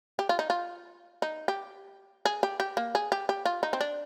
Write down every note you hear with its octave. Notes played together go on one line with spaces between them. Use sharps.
G4
F4
D#4
F4
D#4
G4
G#4
G4
G4
A#3
G#4
G4
G4
F4
D#4
C4
D4